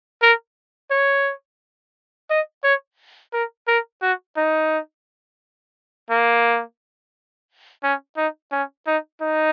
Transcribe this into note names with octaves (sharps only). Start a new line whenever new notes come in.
A#4
C#5
D#5
C#5
A#4
A#4
F#4
D#4
A#3
C#4
D#4
C#4
D#4
D#4